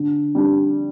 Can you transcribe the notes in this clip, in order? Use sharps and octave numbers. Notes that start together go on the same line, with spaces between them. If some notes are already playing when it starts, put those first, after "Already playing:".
Already playing: D3
G3 D4